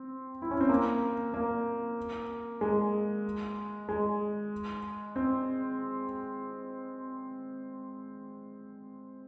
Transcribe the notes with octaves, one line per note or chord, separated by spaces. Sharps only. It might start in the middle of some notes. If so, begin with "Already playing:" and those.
Already playing: C4
E4
C#4
C4
A#3
A#3
G#3
G#3
C4